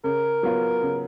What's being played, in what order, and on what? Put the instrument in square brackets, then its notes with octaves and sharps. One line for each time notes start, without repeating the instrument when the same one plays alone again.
[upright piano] C#3 [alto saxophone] A#4
[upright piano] F#3 B3 F4
C#3